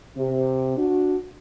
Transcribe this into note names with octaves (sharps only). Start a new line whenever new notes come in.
C3
D4 F#4